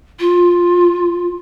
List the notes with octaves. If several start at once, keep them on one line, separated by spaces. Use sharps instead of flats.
F4